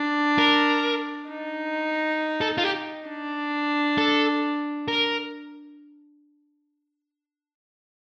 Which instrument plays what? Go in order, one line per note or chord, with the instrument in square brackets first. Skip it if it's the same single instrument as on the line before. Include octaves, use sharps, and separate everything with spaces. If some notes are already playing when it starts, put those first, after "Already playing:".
Already playing: [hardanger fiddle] D4
[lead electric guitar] A#4
[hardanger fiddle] D#4
[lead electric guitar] A4
F4
G4
[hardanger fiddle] D4
[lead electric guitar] A4
A#4